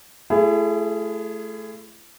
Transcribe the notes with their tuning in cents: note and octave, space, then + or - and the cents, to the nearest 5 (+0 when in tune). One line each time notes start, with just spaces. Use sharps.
A3 -15 E4 +35 G#4 +0